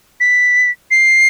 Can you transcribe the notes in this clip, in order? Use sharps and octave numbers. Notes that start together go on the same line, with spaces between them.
B6
C7